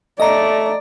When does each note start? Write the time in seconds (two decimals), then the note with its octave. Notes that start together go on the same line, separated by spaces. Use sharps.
0.20 A3 D5 D#5 A#5